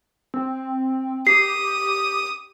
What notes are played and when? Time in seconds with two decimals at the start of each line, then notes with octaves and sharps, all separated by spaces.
0.34 C4
1.27 G4 D#6 C7